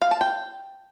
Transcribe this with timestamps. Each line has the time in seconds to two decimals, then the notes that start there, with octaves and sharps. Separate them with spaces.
0.02 F5
0.11 A5
0.21 G5